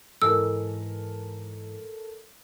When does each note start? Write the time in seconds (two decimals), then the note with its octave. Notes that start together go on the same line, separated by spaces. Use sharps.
0.22 G#2 E3 A4 A#4 E6